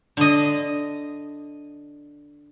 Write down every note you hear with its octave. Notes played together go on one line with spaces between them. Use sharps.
D3 D#5